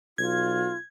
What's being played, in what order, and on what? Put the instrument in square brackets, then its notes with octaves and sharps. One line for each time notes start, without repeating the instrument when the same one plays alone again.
[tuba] B1 [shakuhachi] F4 [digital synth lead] G#6